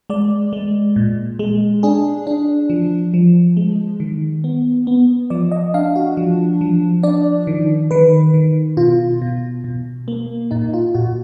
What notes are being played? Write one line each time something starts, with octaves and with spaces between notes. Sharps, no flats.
G#3 D5
G#3
A#2
G#3
D4 G#4
D4
F3
F3
G#3
D#3
B3
B3
F3 D5
D#5
D4 F5
F#4
F3
F3
D4 D5
D#3
D#3 B4
D#3
B2 F4
B2
B2
A#3
A#2 D#4
F4
A#2 F#4